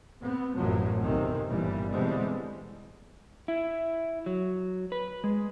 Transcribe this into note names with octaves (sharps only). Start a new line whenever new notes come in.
B3 C4
A1 F#2 A2 C3 F3 F#3
B1 C3 D#3 C4 C#4
G1 A#2 E3 G3
B2 D3 E3 G3 G#3 C4
E4
F#3
B4
G#3